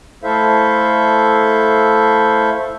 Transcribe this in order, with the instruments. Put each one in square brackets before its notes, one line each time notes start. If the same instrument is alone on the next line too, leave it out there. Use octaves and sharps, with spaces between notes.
[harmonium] A3 E4 A4 C5 E5 F5